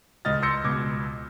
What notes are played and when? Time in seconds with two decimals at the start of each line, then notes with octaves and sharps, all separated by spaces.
0.25 C#2 D#5 F6 A6
0.42 C6 E6 G6 A#6 C#7
0.64 C#2 B2 D6 G#6